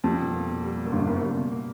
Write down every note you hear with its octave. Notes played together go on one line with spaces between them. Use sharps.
F2 G3
B2
A#3
B2
G3
B2
F#2
G1 G2 A#3
F#1 F#2 B2
G3
B2
A#3